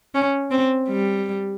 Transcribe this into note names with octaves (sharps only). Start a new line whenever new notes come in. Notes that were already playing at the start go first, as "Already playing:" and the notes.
C#4
C4
G3